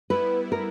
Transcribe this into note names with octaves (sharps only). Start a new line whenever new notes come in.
G3 B3 E4 B4
A#4